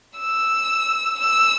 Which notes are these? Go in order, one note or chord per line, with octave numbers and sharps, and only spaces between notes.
E6
E6